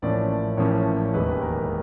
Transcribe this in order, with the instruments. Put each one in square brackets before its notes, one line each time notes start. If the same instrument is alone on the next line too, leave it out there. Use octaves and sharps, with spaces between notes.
[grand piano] A1 A2 F3 A#3 C#4 D5
A1 A2 F3 A#3 C#4 C#5
E1 D#2 D#3 G#3 B4
A#4